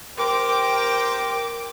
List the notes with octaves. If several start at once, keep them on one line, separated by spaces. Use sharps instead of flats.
G4 A#4 C5 G5 D6